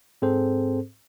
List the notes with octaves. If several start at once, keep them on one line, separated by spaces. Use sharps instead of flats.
G#2 C4 G#4 A4 C5